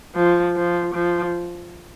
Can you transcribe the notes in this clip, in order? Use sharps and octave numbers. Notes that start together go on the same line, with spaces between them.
F3
F3
F3